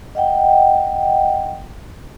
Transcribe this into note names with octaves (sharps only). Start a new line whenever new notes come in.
D#5 F#5 G5